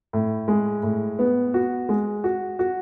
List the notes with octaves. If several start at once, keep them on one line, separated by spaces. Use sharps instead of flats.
A2
G#3
A2
B3
F#4
G#3
F#4
F#4